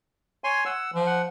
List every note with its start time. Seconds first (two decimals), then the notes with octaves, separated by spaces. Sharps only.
0.44 C#5 G#5 C6
0.66 F#5 E6
0.94 F3
1.06 F#5